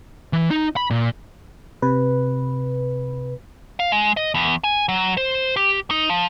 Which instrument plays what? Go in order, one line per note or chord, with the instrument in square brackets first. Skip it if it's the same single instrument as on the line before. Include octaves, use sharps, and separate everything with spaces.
[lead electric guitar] E3
D#4
B5
A#2
[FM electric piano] C3 B4
[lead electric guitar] F5
G#3
D#5
E2
G#5
F#3
C5
G4
D#4
F3